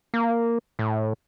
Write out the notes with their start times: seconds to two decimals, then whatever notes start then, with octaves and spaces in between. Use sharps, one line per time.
0.14 A#3
0.79 A2